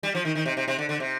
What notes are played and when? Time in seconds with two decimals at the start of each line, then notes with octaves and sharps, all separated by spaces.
0.03 G3
0.15 F3
0.25 D#3
0.35 D#3
0.46 C3
0.57 C3
0.68 C3
0.79 D3
0.89 D3
1.00 C3